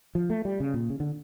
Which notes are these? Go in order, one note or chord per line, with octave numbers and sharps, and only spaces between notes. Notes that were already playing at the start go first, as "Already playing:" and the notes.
F3
A3
G3
C#3
A#2
C#3
D3